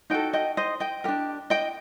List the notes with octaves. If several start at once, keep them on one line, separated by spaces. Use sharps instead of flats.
D#4 F#4 A4 D#5 G5
D#5 G5
C5 D#5
D#5 G5
D4 G4 A#4
D#5 G5